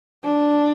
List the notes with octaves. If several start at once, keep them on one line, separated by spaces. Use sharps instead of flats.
D4